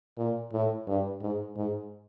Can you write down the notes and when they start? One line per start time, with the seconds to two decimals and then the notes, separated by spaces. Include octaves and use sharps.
0.17 A#2
0.52 A2
0.87 G2
1.21 G#2
1.56 G#2